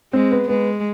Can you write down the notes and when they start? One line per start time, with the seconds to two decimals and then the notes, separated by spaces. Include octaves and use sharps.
0.13 G#3 C4
0.31 B3
0.48 G#3 B3